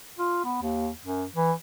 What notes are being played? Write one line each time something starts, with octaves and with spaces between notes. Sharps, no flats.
F4
B3
D#2
F#2
E3